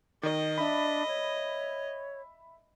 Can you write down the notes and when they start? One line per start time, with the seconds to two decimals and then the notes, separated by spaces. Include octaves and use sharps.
0.23 D#3 D#5
0.58 D4 E5 B5
1.07 C#5